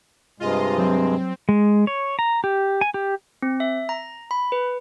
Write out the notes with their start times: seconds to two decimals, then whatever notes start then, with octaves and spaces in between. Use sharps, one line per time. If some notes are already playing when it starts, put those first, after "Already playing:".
0.40 G2 C3 G#3 F4 D#5
0.78 F#3 C4
1.49 G#3
1.87 C#5
2.19 A#5
2.44 G4
2.81 G#5
2.94 G4
3.42 C4
3.60 E5
3.89 A#5
4.31 B5
4.52 B4